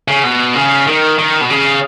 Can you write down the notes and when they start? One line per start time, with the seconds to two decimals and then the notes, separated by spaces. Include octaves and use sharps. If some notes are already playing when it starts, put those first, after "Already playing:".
0.08 C#3
0.23 B2
0.55 C#3
0.87 D#3
1.18 D#3
1.41 B2
1.50 C#3